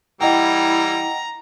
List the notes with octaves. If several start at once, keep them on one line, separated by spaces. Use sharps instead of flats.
E3 G3 E4 D#5 F#5 G5 A#5